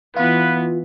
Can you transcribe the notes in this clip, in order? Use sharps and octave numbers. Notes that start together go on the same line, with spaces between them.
E3 B3 F4 B4